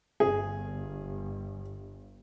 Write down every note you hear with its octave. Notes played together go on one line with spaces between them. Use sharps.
G1 G#4